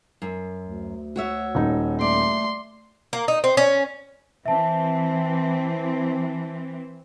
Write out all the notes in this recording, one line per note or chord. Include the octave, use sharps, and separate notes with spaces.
F#2
D2
F#4 C#5 E5
D#1 D#4
A3 D5 C6
A#3
D#4
C4
C#4
E3 C4 E5 A5